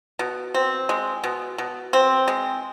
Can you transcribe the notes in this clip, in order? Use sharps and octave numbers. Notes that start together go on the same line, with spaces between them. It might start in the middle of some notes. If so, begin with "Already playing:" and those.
B2
C4
G#3
B2
B2
C4
G#3